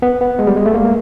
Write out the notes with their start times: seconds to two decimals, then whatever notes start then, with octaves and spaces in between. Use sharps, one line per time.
0.02 B3
0.21 B3
0.39 G#3
0.47 G3
0.56 G#3
0.66 A3
0.74 A#3